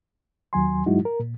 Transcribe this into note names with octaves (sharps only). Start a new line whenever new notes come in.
D#2 F#3 G#5 C6
G2 F#3 G#3 D#4 E4 F#4
A#4
A#2